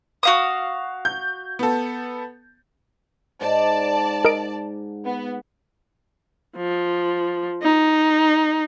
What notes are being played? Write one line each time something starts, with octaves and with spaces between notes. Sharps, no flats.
F#4 F5 D#6
G6
B3 A4
G#2 D5 A5
A#4 D#5 D7
B3
F3
D#4